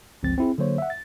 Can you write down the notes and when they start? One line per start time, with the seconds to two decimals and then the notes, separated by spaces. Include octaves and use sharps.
0.23 G1 C#2 F3 C4 A6
0.38 C4 E4 G#4
0.58 D3 F#3 A#3 C5 C#5
0.78 E5 F#5
0.90 A6